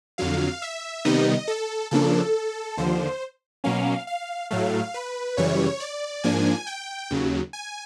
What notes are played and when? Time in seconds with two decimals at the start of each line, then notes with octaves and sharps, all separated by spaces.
0.18 F2 D3 F#3 F5
0.62 E5
1.05 C3 D#3 G3 B3 D#4 D#5
1.48 A4
1.91 C#3 F3 A#3 D4 A4
2.77 D#2 D3 F3 C5
3.64 B2 F#3 A#3 C#4 F5
4.07 F5
4.51 A2 F#3 A3 F5
4.94 B4
5.37 F#2 C#3 E3 G3 C#5
5.80 D5
6.24 G#2 F3 A#3 D4 G#5
6.67 G5
7.11 D#2 C#3 F#3
7.53 G#5